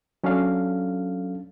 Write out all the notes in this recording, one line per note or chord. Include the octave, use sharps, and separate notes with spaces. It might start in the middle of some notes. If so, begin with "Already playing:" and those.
F#3 C#4 D4 A4 F5